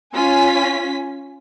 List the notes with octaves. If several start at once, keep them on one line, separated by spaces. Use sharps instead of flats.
C#4 F4 G#5 B6